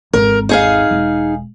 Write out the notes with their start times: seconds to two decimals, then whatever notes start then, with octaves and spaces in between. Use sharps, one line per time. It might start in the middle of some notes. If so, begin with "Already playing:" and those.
0.13 G#1 E2 A#4
0.49 D#4 G#4 F5
0.91 E1